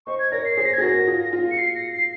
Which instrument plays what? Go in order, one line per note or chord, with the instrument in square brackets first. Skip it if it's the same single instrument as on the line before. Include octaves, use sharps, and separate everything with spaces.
[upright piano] C5 D#5 [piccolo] C#6
[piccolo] G#6
[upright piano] A#4 C#5 [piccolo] A#6
[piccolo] C7
[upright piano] G#4 C5 [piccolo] C7
[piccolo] A#6
G#6
[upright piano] G#4
[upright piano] F#4 A#4 [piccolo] A#6
[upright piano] F4 G#4
F4
[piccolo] C#7
C7
A#6
C7